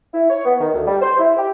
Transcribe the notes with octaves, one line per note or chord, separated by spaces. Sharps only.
E4
C#5
B3
D#3
D2
G3
C5
E4
G4